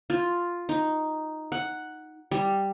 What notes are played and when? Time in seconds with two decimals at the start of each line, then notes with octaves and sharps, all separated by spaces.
0.10 F4
0.69 D#4
1.52 F#5
2.31 G3